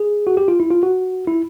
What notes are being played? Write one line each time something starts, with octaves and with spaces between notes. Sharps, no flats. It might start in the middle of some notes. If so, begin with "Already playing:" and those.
Already playing: G#4
F#4
G4
F4
E4
F4
F#4
E4